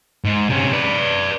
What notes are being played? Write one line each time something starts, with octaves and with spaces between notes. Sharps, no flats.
G#2
C3 C#4
B4 D5